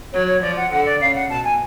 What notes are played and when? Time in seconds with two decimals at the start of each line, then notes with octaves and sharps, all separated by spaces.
0.13 F#3 C#5
0.27 C#5
0.42 F3 D5
0.57 F#5
0.71 D3 F#5
0.86 D5
1.00 C#3 F5
1.15 F#5
1.30 B2 A5
1.44 G#5